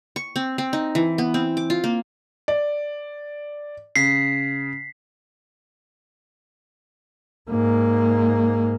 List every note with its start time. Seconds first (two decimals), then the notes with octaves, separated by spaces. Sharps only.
0.16 C#6
0.36 C4
0.58 C4
0.73 D#4
0.95 E3
1.18 B3
1.34 C4
1.57 D6
1.70 F4
1.84 A#3
2.48 D5
3.96 C#3 B6 C7
7.50 G#2 A#3